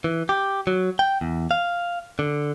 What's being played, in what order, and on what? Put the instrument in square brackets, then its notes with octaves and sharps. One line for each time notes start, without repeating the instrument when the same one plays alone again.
[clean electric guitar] E3
G4
F#3
G5
E2
F5
D3